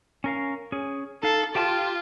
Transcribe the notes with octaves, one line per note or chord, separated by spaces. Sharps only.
C#4 A#4 F5
C#4 G#4
D#4 A4 F5
F4 G4 G5 A5